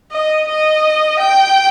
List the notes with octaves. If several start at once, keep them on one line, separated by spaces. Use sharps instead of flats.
D#5
D#5
G5